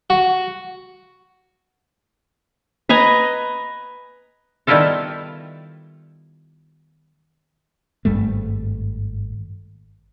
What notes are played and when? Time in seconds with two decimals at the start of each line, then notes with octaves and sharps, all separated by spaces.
0.10 F#4
2.89 B4 D#5 G#5 A#5
4.67 D#3 G3 B3 E4 F4 A4
8.05 G#1 G2 G3 A3